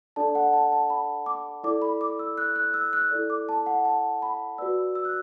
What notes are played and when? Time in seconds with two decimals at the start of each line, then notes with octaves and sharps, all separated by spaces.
0.16 D4 A4 D5 A5
0.35 F#5
0.53 A5
0.72 A5
0.90 B5
1.26 D6
1.64 E4 A4 D5 D6
1.82 B5
2.01 D6
2.19 E6
2.38 F#6
2.56 F#6
2.74 E6
2.93 F#6
3.11 E4 A4 D5
3.30 D6
3.49 A5
3.66 F#5
3.85 A5
4.22 B5
4.58 F#4 B4 D5 E6
4.95 E6
5.05 F#6